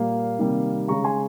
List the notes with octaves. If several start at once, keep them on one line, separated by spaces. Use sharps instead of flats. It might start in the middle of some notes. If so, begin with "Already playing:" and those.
Already playing: A#2 G3 A#3 F5
C3 D#3 G3 A#3
C#3 G#3 A#5 C#6
G#5 C6